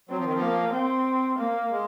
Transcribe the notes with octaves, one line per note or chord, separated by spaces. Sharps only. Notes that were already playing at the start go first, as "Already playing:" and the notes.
F#3 C4
F3
D#3
F3
A#3
C4
A#3
G#3